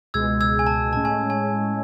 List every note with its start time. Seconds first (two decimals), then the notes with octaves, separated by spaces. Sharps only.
0.14 C#2 B2 G#3 E6 G#6
0.41 E6 G#6
0.59 G#5
0.67 A5
0.93 A2 G#3 C#4 A5
1.05 G#5
1.30 G#5